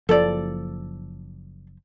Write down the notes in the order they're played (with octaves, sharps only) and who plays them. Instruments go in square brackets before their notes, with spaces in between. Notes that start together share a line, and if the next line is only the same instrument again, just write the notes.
[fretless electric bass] F#1 F3 [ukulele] A4 D5